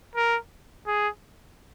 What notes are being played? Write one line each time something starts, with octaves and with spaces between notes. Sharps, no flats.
A#4
G#4